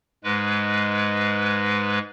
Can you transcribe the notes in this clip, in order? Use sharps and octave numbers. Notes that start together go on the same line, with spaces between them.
G#2 G#3 B4